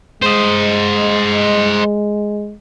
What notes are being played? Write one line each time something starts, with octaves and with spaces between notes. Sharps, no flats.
G#3 C5 D#5